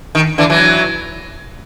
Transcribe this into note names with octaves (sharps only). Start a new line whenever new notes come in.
D#3
D3 E3
E3 F#3